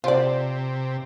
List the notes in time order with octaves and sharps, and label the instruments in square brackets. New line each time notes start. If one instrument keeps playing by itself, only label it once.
[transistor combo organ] C3 [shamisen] F4 D5 [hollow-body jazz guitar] C5